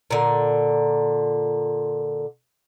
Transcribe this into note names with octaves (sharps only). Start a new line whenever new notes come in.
A#2 D3